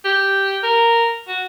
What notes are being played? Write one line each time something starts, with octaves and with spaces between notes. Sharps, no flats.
G4
A#4
F#4